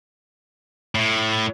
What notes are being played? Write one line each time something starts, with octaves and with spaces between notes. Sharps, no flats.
A2